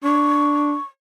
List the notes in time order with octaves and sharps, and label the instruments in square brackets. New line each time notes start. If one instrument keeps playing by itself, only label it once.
[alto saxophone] D4 [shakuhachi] C#6